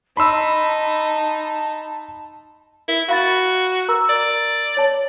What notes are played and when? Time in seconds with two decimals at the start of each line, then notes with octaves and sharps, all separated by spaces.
0.17 D#4 A5 B5 C6 E6
2.88 E4 A#4
3.09 F#4 F5 B5 A6
3.88 A#4 A#5 E6
4.09 D5
4.77 C#5 A5 F#7